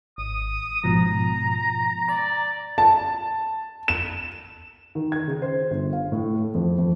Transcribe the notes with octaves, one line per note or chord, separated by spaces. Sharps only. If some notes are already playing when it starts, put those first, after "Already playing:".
G#1 D#6
G#2 B2 F3 A#5
D5 A#5
A5
E7
D#3
G#6
C#3
C5
G1
F5
A2
A3
F2
F2